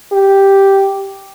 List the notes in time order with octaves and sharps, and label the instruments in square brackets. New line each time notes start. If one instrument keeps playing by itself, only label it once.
[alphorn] G4